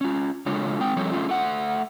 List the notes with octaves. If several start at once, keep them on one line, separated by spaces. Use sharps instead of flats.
C#4 F4
C#3 G#3 D4 F4 A4 C#5
G#3 C4 G5
F3 G3 C4 A4 C#5
A3 C#4 F4
A3 F#5